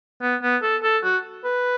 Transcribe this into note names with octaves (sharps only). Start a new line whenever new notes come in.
B3
B3
A4
A4
F#4
B4